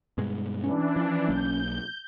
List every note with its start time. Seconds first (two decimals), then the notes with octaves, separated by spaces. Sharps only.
0.18 G2 B2 G#3
0.64 E3 C#4 D4
0.96 F3
1.28 B1 F#3 A#3 G6